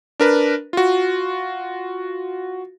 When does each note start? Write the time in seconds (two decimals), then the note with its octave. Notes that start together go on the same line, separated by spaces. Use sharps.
0.20 D4 A#4 B4
0.73 F4 F#4